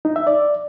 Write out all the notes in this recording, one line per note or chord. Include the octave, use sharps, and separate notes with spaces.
D#4
E5
D5